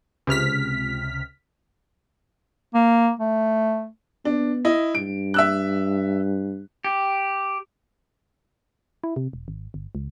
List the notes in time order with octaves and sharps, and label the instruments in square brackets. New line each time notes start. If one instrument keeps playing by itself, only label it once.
[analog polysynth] C#2 C3 F6 B6
[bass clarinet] A#3
A3
[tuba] B3 [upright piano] D4
[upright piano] E4 D#5
[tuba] G2 [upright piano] D7
[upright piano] E5 E6 F#6
[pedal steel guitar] G4
[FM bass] E4
C3
E1
G#1
G1
C#2